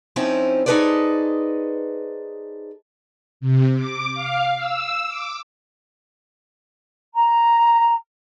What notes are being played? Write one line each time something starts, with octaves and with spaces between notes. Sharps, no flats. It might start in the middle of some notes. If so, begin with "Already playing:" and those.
F3 C4 C#4 D#4 E4
D#4 G#4 A4 B4 C5 D5
C3
D6
F5
E6
D6
A#5